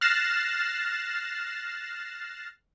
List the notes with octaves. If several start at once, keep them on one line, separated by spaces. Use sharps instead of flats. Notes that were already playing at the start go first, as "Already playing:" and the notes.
F6 F#6 A6 A#6 C7 E7